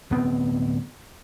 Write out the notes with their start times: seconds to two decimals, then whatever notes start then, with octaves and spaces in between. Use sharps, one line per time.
0.11 D1 B3 C4